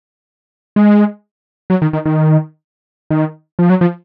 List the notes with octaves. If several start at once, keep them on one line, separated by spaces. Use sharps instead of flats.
G#3
F#3
D#3
D#3
D#3
D#3
F3
F#3
F3